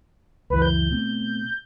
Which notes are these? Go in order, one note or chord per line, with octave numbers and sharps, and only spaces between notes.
C#2 F#2 E3 B4
G6
B2 A3 C4